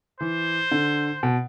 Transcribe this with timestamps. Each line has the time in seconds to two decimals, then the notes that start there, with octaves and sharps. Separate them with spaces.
0.20 E3 C5
0.71 D3
1.23 B2